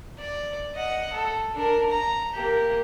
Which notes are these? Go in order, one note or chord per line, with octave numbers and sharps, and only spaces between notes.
D5
D#5 F#5
A4
D4 A#4
A#5
A#3 G4